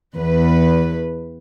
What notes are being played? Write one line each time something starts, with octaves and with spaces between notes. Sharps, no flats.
E2 B4